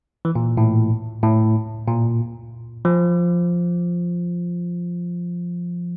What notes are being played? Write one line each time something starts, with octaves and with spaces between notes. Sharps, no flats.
E3
A#2
A2
A2
A#2
F3